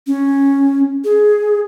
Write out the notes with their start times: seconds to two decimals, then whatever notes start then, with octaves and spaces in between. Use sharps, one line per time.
0.07 C#4
1.04 G#4